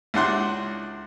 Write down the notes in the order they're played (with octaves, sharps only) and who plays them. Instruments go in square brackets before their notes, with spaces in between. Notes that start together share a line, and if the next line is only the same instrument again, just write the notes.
[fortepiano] C#2 D4 E4 F#5 C6 F#6